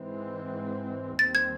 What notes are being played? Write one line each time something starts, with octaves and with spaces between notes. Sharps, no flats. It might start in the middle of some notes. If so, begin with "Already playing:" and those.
Already playing: G#2 E3 G#3 C4
D#2 D#3 G3 C4 A6
G#6